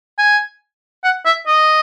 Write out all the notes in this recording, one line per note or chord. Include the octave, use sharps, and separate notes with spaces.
G#5
F#5
E5
D#5